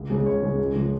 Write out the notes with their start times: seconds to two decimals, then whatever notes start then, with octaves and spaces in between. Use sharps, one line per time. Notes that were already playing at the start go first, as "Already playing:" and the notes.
Already playing: C#2
0.10 C#3 G#3 G#4
0.26 C#2 C#5
0.42 C#3 G#3
0.59 C#2
0.75 C#3 F3 G#3